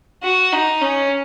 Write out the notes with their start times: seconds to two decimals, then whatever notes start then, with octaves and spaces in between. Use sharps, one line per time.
0.23 F#4
0.52 D#4
0.81 C#4